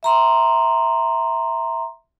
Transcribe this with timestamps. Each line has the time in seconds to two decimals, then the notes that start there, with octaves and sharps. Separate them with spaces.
0.03 E5 A#5 C6